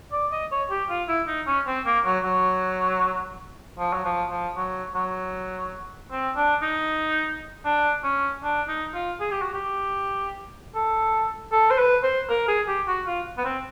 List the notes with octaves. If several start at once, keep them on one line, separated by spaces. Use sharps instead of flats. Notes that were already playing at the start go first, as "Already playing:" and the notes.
D5
D#5
C#5
G4
F4
E4
D#4
C#4
C4
A#3
F#3
F#3
F3
F#3
F3
F3
F#3
F#3
C4
D4
D#4
D4
C#4
D4
D#4
F4
G#4
G4
F#4
G4
A4
A4
C5
B4
C5
A#4
G#4
G4
F#4
F4
B3
C4